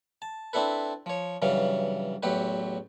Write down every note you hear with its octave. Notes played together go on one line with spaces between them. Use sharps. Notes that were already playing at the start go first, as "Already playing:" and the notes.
A5
C4 D4 E4 A4 B4
F3 C#5
G2 C#3 E3 F#3 F5
A1 E2 F#3 G4 B4